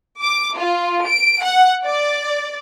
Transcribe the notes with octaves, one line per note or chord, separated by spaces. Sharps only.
D6
F4
D7
F#5
D5